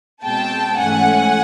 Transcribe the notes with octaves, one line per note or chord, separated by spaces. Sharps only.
B2 G#3 C4 G5 A5
G#2 E3 A3 C#4 F#5 G#5